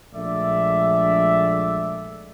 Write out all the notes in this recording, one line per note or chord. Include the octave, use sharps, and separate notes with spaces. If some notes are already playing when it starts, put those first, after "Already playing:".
A#1 G#3 A3 D5 E5